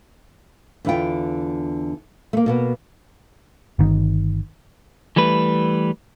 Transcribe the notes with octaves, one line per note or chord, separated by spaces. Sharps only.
E2 D3 E4 F4 G5
A3 A#3
B2 A#3 B3
G1 D#3
E3 G3 A3 B4